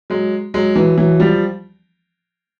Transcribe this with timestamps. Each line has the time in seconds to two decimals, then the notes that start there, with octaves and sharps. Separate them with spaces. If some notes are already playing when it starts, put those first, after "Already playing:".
0.10 F#3 G#3
0.54 F#3 G#3
0.75 E3 F#3
0.98 E3 F#3
1.20 F3 G3